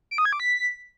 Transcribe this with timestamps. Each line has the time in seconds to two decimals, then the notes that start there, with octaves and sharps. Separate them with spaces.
0.11 D7
0.18 D#6
0.25 G#6
0.33 D6
0.40 B6